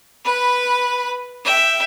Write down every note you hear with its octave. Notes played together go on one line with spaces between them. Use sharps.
B4 B5
E5 G5